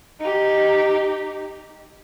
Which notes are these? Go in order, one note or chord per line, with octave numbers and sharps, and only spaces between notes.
D#4 G4